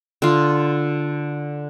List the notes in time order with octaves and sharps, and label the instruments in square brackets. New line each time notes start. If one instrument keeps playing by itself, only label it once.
[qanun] D3 F4